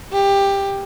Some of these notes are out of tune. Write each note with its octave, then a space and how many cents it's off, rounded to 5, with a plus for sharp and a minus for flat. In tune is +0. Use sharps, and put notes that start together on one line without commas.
G4 +15